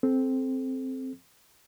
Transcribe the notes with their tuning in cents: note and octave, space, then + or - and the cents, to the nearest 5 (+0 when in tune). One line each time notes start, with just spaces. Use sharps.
C4 +0 A4 -25